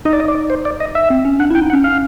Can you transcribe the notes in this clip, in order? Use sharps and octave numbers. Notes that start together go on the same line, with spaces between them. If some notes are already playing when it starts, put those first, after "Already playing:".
D#4 D#5
D5
D#5
D5
C5
D5
D#5
E5
C4
C#4
D4 F#5
E4 G5
D#4
F#5
C#4
F5